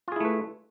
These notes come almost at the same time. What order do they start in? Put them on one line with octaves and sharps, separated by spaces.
F4 G#4 E4 A3 B4